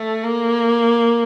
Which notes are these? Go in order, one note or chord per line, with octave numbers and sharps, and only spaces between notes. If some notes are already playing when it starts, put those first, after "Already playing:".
Already playing: A3
A#3